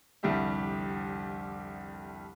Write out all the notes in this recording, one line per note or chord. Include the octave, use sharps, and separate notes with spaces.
F1 C2 D3 G3 G4 E5